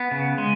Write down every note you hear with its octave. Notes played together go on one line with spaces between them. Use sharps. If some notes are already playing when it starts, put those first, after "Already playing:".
Already playing: B3
C#3
G#3